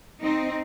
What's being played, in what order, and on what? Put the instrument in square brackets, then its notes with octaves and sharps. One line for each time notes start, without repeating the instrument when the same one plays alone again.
[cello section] C4 D#4